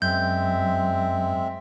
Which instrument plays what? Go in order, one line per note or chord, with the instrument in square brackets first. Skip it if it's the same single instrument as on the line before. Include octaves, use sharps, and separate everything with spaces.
[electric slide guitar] F#2 [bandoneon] G#3 C4 E5 [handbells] G6